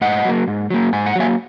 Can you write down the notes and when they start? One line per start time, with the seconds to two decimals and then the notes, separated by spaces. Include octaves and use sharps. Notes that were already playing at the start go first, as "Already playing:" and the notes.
0.01 G#2 D#5 F#5
0.25 F#3 A#3
0.48 G#2
0.70 F#3 A#3
0.93 G#2 G#5
1.06 F#5
1.16 F#3 A#3 E5 G#5